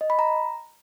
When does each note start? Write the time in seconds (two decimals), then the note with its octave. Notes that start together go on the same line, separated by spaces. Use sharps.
0.01 D#5
0.10 B5
0.19 A#5